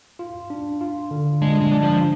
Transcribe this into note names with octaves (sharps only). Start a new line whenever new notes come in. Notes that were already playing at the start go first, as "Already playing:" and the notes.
F4
D4
F4
D3
G#3 D4
G#3
D4
F3